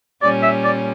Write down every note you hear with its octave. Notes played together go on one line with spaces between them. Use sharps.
A#2 G3 C#4 D5
E5
D5